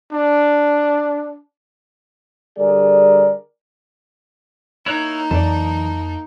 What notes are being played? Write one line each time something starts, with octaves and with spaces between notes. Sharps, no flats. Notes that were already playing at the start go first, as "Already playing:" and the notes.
D4
D3 G3 G#4 A#4 D5
A#3 D#4 E4 C#5 F#6
F2 E3 F#3 D5 A5